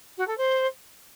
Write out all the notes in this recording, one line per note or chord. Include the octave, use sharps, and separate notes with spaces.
F#4
A4
C5